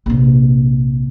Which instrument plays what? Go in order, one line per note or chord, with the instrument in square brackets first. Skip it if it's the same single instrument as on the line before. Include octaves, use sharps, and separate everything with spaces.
[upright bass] A#1 C3